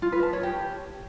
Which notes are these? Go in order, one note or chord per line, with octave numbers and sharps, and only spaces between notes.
F4
B4
A5
C#5
G4